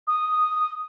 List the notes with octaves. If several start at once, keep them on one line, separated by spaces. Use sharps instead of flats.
D#6